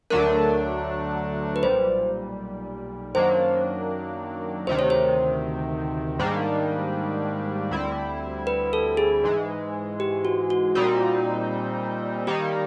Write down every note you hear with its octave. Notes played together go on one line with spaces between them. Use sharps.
D2 D3 F#3 A3 D4 A#4
B4
B1 A#2 G3 C5
F#2 D#3 F#3 A#3 D4 C5
D2 C3 D#3 C5
C#5
C5
G#2 D#3 G3 A#3 D4
D2 D3 G3 C4 E4
B4
A4
G#4
G#2 E3 G#3
G4
F#4
F#4
A#2 G3 C4 D#4 F#4
D#3 G3 A#3 D#4 G4